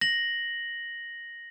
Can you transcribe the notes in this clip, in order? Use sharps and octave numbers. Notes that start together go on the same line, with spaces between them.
A#6 F#7